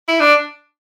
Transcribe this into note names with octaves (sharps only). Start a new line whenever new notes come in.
E4
D4